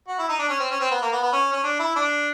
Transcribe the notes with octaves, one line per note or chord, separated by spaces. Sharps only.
F#4
E4
D#4
D4
C#4
C4
C#4
C4
B3
A#3
B3
B3
C#4
C#4
D4
E4
D4